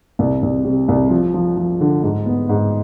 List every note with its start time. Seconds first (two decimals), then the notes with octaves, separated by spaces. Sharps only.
0.19 C2
0.42 C2
0.65 C3
0.88 C2
1.10 F3
1.34 F3
1.57 F3
1.81 D3
2.03 G#2
2.26 B3
2.49 G#2